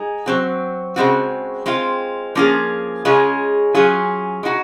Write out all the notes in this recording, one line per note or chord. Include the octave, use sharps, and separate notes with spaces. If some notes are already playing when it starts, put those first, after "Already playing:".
Already playing: G#3 D#4 G#4
F#3 C4 F#4
C#3 G#3 C4 F#4
G#3 C4 F4
F3 A#3 C#4 F4 G#4
C#3 G#3 C#4 F4 G#4
F#3 C#4 F4 G#4
G#3 D#4 F#4